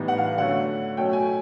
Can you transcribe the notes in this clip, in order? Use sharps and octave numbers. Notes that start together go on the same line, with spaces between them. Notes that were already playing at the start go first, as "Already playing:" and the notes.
Already playing: A2 E3 G3 B3 D#4
F#5
F5
D3 F#3 A3 C#4 F#5
B2 F#3 A3 C#4 G5
G#5